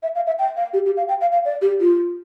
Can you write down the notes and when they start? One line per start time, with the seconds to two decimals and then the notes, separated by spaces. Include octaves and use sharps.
0.03 E5
0.15 F5
0.27 E5
0.39 G5
0.56 F5
0.73 G4
0.86 G4
0.97 F5
1.08 G5
1.21 F5
1.32 F5
1.45 D5
1.62 G4
1.80 F4